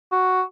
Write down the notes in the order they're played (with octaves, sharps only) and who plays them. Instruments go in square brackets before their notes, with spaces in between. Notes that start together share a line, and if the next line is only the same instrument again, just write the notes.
[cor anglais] F#4